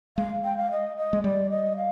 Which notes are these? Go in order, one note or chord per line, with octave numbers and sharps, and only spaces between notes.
G#3 F5
G5
F5
D#5
D#5
G#3
G3 D5
D#5
F5